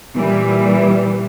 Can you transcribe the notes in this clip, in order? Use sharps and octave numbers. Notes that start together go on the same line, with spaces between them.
A#2 E3 G3